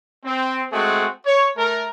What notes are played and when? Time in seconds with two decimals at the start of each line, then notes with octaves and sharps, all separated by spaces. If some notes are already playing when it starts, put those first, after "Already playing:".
0.25 C4
0.72 G#3 A3 C4 F#4 G#4
1.26 C#5
1.57 A3 A#4